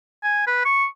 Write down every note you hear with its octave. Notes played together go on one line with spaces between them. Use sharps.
G#5
B4
C#6